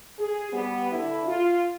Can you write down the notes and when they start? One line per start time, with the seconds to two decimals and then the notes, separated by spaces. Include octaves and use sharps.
0.19 G#4
0.52 G3 B3
0.92 D3 E4
1.27 F4